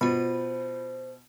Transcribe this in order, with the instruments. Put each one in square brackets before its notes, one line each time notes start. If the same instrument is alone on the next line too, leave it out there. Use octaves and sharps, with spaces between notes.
[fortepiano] B2 [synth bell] F4 B5 [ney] C5